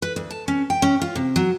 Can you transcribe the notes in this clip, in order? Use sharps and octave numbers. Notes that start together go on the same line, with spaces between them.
B4
D2
A5
C#4
G5
C#4
F4
C3
F#3